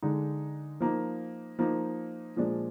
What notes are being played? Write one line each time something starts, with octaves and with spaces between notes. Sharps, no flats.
D3 G#3 D#4
F3 A#3 D#4
F3 A#3 D#4
A#2 F3 G#3 D4